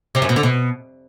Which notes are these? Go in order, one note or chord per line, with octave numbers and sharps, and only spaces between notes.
C3
F#2
B2
D3
B2